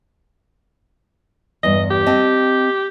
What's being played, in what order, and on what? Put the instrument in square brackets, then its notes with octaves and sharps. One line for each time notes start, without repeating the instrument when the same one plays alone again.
[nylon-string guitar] E2 G2 [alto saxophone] D#5
[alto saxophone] G4
[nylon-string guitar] C4 D#5 A5